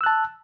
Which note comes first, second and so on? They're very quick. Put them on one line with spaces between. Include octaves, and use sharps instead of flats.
E6 F#6 A5